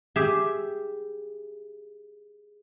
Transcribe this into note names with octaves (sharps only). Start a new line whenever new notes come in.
G4 G#4 E5